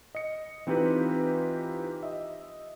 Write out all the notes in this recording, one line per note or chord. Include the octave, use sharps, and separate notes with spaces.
D#5 C#7
E3 C4 D#4 F4 G4 B4
D#5 E5